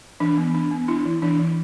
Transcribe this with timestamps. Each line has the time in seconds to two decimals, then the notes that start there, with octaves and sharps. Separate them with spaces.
0.20 E3 D4
0.37 B3
0.54 D4
0.71 B3
0.88 D4 E4
1.06 E3
1.22 E3 D4
1.40 E3